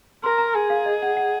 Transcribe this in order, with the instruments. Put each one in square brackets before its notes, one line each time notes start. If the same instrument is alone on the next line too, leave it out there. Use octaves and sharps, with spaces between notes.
[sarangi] A#4 [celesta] C6
[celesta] A#5
[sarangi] G#4 [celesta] G#5
[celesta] F5
D#5
F#5
F#5